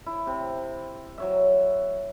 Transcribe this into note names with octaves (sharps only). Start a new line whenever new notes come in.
E4
C3
F#3 C#5 E5